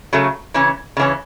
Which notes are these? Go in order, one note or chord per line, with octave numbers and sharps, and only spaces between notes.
C#3 F#3 A3
C#3 E3 C#4
C#3 E3 C#4